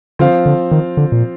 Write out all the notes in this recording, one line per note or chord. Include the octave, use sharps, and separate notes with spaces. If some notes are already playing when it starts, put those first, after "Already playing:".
D3 F3 C4 F4 C5 F5
D3
D#3
D3
A#2